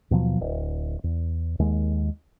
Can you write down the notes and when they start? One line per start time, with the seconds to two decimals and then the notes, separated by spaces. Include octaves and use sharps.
0.11 D#2 B2 F3 F#3
0.40 D1
1.04 E2
1.59 D#2 G#3